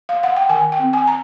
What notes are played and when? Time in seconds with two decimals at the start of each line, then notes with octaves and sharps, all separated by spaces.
0.09 F5
0.23 F#5
0.36 G5
0.49 D#3 G#5
0.72 G5
0.79 C4
0.93 G#5
1.07 A#5